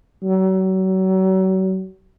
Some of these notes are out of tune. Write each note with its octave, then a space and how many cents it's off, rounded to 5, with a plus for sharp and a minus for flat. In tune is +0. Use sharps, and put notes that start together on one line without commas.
F#3 +35